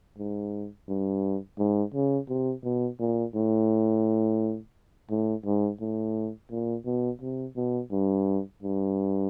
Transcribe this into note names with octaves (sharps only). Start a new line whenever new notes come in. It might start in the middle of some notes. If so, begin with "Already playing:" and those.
G#2
G2
G#2
C#3
C3
B2
A#2
A2
A2
G#2
A2
A#2
B2
C3
B2
G2
G2